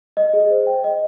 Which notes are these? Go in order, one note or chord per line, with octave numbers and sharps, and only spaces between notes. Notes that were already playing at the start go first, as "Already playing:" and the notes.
D#5
G#4
C5
G5
D#5